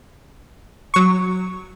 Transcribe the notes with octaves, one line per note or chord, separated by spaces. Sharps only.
F#3 C#6